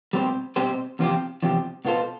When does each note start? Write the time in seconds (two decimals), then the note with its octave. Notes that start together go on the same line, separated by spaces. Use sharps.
0.13 B2 G3 C4 G4 C5
0.56 B2 G3 C4 G4 C5
0.99 E2 C3 F3 C4 G4
1.42 E2 C3 F3 C4 G4
1.85 B2 B3 F4 A4 C5